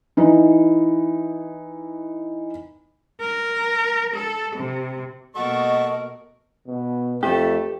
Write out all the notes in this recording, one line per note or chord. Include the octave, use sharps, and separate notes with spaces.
E3 D#4
A#4
A4
C3
B2 A#3 F#4 A4 A#4 D#5 C#6
B2
F2 A3 G4